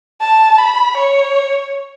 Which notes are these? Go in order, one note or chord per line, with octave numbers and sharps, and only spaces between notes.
A5
B5
C#5